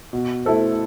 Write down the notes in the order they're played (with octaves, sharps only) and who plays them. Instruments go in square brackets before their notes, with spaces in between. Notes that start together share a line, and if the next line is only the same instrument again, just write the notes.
[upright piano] B2
A3 E4 A4 C5